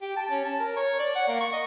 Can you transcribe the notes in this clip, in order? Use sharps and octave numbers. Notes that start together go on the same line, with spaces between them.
G4
A5
C#4
A5
A#4
C#5
D5
F#5
A#3
C#6
D#5